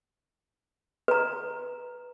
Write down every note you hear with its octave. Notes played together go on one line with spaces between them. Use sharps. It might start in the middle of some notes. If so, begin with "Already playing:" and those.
B4 A#5